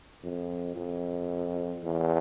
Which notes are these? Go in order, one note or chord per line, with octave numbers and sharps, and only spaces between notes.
F2
F2
E2